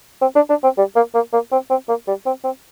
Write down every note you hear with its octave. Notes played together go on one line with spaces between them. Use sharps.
C4
D4
D4
C4
G3
A#3
A#3
A#3
C4
C4
A#3
G3
C4
C4